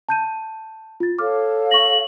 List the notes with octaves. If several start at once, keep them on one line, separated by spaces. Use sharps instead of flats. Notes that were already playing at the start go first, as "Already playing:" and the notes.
A5 G6 D#7
F4 A6
A4 C#5 F5 D6 F6
C#6 A#6 F#7